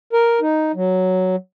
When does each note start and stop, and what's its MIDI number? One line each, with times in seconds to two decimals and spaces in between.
0.13 0.40 70
0.41 0.72 63
0.75 1.36 54